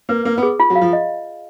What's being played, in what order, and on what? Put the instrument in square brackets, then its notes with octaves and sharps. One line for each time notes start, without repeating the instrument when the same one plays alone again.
[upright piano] A#3 [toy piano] B4
[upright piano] A#3 [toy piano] B4
[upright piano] B3
[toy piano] G#4
F4
[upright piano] F#3
[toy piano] F5
[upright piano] F3
[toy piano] D#5